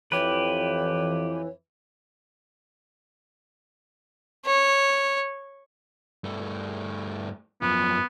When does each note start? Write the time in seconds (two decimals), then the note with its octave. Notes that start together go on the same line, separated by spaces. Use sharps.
0.12 F2 E3 G4 B4 C#5
4.46 C#5
6.24 G2 A3
7.62 F#2 F3 B3